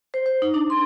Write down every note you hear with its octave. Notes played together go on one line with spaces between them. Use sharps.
C5
C5
D#4
D4
C6